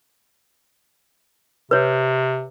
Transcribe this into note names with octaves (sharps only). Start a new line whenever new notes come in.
C3 B4 C#5